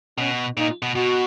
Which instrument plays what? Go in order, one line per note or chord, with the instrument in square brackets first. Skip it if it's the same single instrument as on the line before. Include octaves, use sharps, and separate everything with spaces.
[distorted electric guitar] B2 [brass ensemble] C#4
[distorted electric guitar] A#2 [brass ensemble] D#4
[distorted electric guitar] B2
[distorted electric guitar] B2 [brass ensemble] F#4